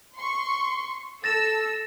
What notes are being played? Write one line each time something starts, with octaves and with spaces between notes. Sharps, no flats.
C6 C#6
A4 E6 A6 A#6 E7